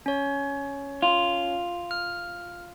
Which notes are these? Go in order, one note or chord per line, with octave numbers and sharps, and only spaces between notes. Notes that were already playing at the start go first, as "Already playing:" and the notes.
C#4 C#5
F4
F6